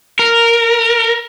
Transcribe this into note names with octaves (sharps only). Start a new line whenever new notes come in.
A#4